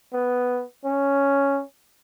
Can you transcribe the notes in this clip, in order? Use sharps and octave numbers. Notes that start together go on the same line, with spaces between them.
B3
C#4